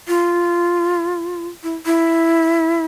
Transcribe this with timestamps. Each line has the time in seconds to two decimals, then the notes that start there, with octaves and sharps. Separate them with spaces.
0.08 F4
1.63 E4
1.86 E4